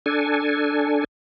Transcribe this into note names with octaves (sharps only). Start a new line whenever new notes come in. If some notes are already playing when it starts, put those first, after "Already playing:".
D4 A4 G#5